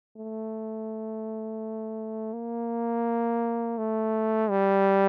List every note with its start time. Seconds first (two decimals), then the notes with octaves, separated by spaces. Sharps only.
0.17 A3
2.33 A#3
3.78 A3
4.50 G3